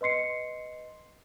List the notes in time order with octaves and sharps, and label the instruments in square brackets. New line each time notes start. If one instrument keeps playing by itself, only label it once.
[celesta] B4 D#5 C6 C7 C#7